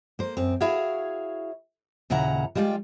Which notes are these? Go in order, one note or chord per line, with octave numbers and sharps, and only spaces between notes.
A#3 C5
F#2 C4
E4 F#4 G#4 C#5 F5
D#2 A#2 C#3 E4 F#5 A#5
G3 G#3 F4 D5 G5